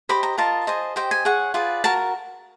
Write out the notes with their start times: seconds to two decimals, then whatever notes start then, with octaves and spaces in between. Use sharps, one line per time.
0.09 G4 C5 D#5 B5
0.23 A#5
0.38 F4 A#4 D#5 A5
0.67 G#4 C5 D#5
0.96 G4 C5 D#5 G5
1.11 G#5
1.25 G#4 C#5 F#5
1.54 F4 G#4 B4 D5
1.84 F#4 A#4 A5